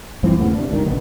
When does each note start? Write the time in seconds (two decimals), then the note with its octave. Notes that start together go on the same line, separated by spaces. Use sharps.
0.23 G2 E3 F3 C4
0.38 D#2 A2 C#3 B3
0.54 C3 D4
0.69 G1 C#2 G2 D#3
0.85 A#1 C#3 B3